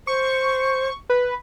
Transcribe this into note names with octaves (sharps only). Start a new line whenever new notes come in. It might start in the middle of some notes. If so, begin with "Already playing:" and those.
C5 C#6
B4